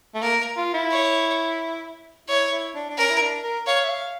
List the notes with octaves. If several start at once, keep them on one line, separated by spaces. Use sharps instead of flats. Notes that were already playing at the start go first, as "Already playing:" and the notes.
A3
A#3 A#4
F4
E4
C#5
E4 C#5
E4
D4
D4
C#4 A#4
E4
D4
A#4
C#5 F5
E5
F5